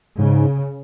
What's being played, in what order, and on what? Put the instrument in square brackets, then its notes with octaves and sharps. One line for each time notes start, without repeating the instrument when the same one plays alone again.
[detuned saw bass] G#2 [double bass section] C#3